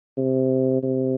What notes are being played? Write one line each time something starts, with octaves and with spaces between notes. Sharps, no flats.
C3
C3